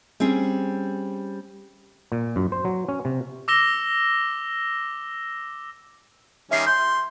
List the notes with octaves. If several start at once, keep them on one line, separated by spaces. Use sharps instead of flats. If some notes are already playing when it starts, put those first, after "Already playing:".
G3 C4 C#4 G#4
A#2
F#2
C5
F#3
C#4
C3
D6 E6 A#6 E7 G7
D#3 G3 C#4 E5 C7
C6 G6